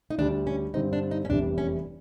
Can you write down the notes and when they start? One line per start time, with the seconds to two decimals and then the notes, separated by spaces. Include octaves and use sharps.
0.10 D#4
0.19 D2 D3 G3 D4
0.47 C#4
0.74 G2 D3 G3 C4 D#4
0.93 D4
1.11 D#4
1.25 C#4
1.30 F1 E2 C3 E3 G3 D4
1.58 C#4